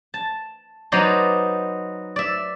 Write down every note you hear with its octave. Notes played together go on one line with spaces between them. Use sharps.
A5
F#3 B3 D#4 C5 D5 D#5
D5 E5